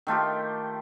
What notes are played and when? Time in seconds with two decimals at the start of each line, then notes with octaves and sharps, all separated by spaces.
0.07 D#3 A3 F4 G4